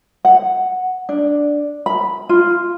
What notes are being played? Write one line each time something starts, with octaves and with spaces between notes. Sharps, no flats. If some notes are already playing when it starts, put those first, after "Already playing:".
F#5
D4
B5
F4